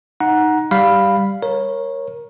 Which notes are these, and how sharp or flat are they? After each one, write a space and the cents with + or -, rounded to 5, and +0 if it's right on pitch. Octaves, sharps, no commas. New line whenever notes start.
D#4 +0 F#5 +0 A#5 +20
G3 +0 F5 +0 B5 +0
A#4 +15 C#5 -15